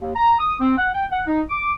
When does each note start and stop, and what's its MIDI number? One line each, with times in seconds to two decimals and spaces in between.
0.01 0.11 39
0.16 0.34 82
0.40 0.55 87
0.60 0.76 60
0.78 0.90 78
0.95 1.05 79
1.11 1.23 78
1.27 1.41 63
1.50 1.73 86